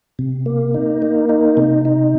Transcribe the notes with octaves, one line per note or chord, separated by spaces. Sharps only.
C3
A#3
D#4
A#3
D#4
C3
D#4